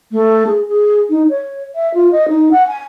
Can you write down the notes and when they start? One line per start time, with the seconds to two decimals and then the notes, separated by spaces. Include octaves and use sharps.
0.12 A3
0.47 G#4
0.69 G#4
1.10 D#4
1.29 C#5
1.75 E5
1.94 F4
2.12 D#5
2.29 D#4
2.51 F#5
2.68 G#5